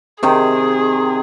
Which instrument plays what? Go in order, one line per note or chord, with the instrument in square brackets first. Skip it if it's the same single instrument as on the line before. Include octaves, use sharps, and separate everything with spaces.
[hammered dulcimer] C3 D#3 [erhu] G#4